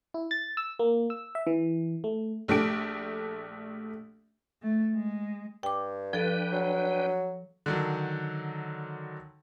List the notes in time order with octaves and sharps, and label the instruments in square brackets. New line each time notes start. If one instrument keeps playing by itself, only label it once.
[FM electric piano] E4
A6
E6
A#3
E6
E5
E3
A3
[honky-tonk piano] A#1 A3 D4 G4 D7
[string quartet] A3
G#3
[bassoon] G2 [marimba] G5 D6
[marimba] F3 A4 [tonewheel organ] D4 B4 G5
[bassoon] F#3
[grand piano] D3 D#3 F#3